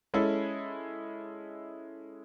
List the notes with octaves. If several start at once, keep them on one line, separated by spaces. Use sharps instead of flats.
G#3 C#4 E4 A4